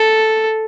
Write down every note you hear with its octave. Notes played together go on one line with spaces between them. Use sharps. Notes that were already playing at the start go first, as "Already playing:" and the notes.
Already playing: A4